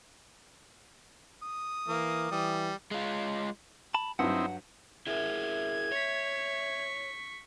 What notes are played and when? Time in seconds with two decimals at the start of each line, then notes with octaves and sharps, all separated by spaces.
1.42 D#6
1.88 E3 A#3
2.31 E3 G3
2.91 G#3 F4
3.94 A5 B5
4.19 G2 F#3 C4 D#4 E4 F#5
5.07 E4 G#4 A#4 E5 G#6
5.92 C#5 C#6 B6